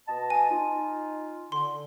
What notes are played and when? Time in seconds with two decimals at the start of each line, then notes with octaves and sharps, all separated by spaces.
0.08 B2 D#5 A5
0.30 G#5
0.50 D#4 F4
1.52 D3 C6